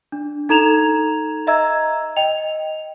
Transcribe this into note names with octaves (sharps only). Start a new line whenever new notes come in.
D4
D#4 A4 A#5 G#6 E7 F7
D#5 E5 A#5 E6 G#6
D#5 G5 F7